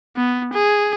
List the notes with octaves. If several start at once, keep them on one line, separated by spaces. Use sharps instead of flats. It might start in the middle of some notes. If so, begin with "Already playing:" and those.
B3
G#4